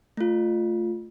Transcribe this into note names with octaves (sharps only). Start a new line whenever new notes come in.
A3 F4